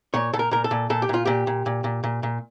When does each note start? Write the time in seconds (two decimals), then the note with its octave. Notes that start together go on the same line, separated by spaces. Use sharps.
0.14 A#2 C#5
0.33 A#2 A4
0.39 A#4
0.51 A#2 A#4
0.64 A4
0.71 A#2
0.90 A#2 A4
1.02 G4
1.09 A#2 F4
1.25 A#2 G4
1.47 A#2
1.66 A#2
1.84 A#2
2.04 A#2
2.23 A#2